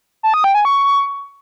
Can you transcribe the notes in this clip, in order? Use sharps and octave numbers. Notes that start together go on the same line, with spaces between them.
A5
D#6
G5
G#5
C#6